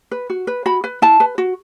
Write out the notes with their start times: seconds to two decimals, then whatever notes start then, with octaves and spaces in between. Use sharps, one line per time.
0.11 B4
0.30 F#4
0.47 B4
0.66 F#4 B5
0.84 B4
1.02 E4 A5
1.20 B4
1.38 F#4